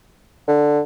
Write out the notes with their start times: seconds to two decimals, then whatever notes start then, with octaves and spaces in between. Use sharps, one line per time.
0.48 D3